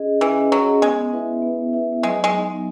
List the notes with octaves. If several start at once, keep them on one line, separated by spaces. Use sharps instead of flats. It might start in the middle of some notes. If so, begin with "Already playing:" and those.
Already playing: C#4 G#4 D#5
E3 C#4
F#3 G#4 D#5
G#3 B3
E4 B4 E5
B3
E4 B4 E5
F#3 G#3
G#3
B3 D#4